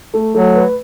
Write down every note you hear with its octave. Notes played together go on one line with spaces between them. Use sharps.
A3
F#3 A3
B4